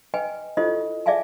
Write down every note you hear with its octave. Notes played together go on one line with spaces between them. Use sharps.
B4 D#5 G5 G#5
E4 F4 G4 A4 C5 D#5
G#4 D5 E5 F5 G#5 A5